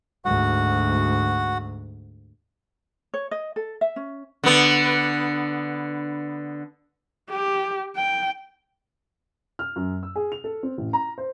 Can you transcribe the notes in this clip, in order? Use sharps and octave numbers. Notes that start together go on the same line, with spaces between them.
D2 G#2 F#4 F#5
C#5
D#5
A4
E5
C#4
D3 B3
G4
G5
F6
F#2
E6
G#4
F7
A4
C4
A1
A#5
C5